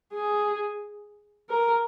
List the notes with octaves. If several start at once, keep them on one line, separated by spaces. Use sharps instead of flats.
G#4
A#4